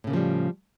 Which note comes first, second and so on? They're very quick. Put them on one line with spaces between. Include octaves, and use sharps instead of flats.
A2 C#3 A#3 F3 G3